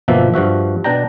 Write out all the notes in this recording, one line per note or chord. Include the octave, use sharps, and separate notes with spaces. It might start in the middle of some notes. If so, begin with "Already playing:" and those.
G1 B2 F3 A#3 E5
G2 F3 F#4 E5
B2 D4 D5 G5 A#5